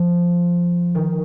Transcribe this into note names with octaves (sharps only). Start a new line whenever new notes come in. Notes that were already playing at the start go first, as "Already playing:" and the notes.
Already playing: F3
D#3